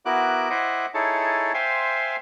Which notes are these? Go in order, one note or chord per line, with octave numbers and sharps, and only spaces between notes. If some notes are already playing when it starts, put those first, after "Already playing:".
B3 E4 F#4 A#4 D6 F#6
E4 C5 D#5 E5 F#5 D6
D#4 E4 G#4 A4 C#5 A5
C5 E5 F5 G5 G#5 C6